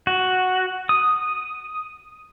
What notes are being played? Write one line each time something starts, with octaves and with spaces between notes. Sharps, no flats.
F#4
D#6